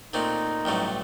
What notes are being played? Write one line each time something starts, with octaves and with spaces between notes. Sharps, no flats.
A#2 A3 C4 D#4
A1 G2 F#3 A3